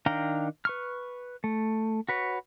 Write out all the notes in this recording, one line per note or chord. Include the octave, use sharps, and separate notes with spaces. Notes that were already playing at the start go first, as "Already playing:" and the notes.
D#3 D4 F5 G5 A#5
B4 C#6 F6
A3
F#4 B4 C#5